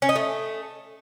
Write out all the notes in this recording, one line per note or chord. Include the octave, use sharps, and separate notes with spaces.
C#4
D#4
A3